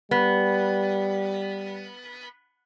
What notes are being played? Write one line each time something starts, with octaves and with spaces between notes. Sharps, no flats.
G3 B3